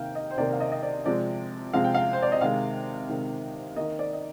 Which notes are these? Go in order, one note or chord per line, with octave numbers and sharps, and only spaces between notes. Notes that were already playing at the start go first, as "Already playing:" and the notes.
Already playing: C3 D#3 A#3 F5 G5
D#5
C5
C3 D#3 A#3 D5
F5
D#5
D#5
D5
C3 F3 G#3 C4 D5
C3 F3 G#3 C4 F5
G5
F5
C5
D5
D#5
C3 D#3 G#3 F5
C3 D#3 G#3
D#3 A#3 D#5
D5
D#5